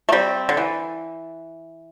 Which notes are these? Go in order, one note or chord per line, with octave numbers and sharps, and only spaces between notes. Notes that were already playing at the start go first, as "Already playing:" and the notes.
A3
G3 C4
D3
E3